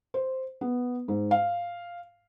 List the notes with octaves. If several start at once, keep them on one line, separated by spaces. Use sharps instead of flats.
C5
B3
G#2
F5